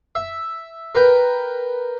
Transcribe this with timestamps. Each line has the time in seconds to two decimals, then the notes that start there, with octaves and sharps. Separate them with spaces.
0.15 E5
0.95 A#4 B4 G5